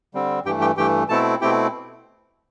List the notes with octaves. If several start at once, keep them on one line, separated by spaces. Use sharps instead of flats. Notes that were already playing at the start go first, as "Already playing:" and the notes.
D3 G3 C4
G2 E3 A3 G4 G5
G4 G5
G2 E3 A3 G4 G5
B2 A3 C4 E4 A4 A5
B2 A3 C4 E4 G4 G5